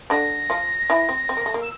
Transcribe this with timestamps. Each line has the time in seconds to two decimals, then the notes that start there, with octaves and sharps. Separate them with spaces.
0.10 D3 D4 A#6
0.50 F3 F4
0.90 E3 E4
1.09 C4
1.29 C4
1.37 A#3
1.46 A3
1.54 A#3
1.61 E6